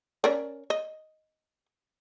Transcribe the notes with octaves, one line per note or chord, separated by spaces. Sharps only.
C#4 A#4 D5
D#5